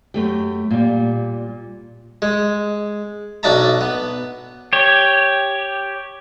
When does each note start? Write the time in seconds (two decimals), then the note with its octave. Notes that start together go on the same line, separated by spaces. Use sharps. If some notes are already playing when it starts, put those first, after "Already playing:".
0.14 F#2 A3 G4
0.70 A#2 G3
2.22 G#3
3.43 B1 D4 D#5 E5 A5 A#5
3.81 B3
4.73 G4 C#5